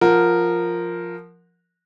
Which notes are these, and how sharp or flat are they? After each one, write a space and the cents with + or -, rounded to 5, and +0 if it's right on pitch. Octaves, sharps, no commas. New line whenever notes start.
F3 +0 A#4 -5 F#5 -20